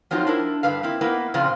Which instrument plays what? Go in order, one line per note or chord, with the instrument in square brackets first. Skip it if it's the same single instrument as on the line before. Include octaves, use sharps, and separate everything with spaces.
[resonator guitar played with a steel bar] F3 F#3 A#3 C4 D#4 F4
D4 E4 A#4
G2 D3 B4 F5
A#3 C4 E4
A#3 B3 E4 B4
A#2 C#3 F3 C4 F4